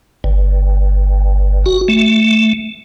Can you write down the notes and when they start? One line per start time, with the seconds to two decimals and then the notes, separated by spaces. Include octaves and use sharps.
0.24 G1
1.66 F#4
1.88 A3